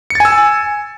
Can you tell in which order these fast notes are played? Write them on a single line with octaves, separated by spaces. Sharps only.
C#7 A6 G#5 E6